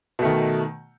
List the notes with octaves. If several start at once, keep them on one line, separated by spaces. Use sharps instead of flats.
B2 D#3 A3